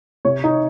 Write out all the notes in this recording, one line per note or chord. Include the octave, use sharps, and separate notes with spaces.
C3 C#5
D#4